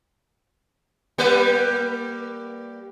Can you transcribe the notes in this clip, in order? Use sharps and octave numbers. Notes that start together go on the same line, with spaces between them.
G3 A#3 B4